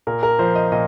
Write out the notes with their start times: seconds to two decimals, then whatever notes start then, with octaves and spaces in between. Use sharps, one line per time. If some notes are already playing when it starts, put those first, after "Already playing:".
0.07 A#2 A#4
0.23 A#4
0.39 F3 C5
0.55 D#5
0.72 A#2 D#5